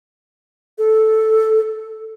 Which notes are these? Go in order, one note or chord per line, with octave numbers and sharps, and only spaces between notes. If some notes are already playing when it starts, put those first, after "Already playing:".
A4